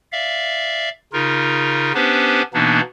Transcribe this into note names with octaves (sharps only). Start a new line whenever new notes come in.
D5 E5 F5
C#3 D#4 F4 A#4
B3 C#4 D4 G4 B4 C5
B2 E3 A#3 B3 D4 D#4